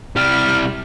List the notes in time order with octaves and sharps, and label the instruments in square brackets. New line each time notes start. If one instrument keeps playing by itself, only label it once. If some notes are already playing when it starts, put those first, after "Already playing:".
[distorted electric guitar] C2 G3 [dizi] F6